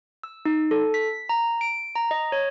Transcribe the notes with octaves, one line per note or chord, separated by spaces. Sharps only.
E6
D#4
A4
B6
A#5
D7
A#5
D#5
C#5